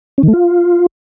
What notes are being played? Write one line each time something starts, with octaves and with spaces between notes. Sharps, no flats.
C#4
D#3
A3
F4